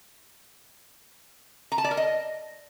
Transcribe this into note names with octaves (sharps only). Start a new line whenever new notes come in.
A#5
A5
D5
A#4
D#5